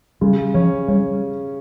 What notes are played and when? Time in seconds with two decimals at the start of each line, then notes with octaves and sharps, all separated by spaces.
0.21 C#3 G3
0.54 F3 C#4
0.88 G3 C#4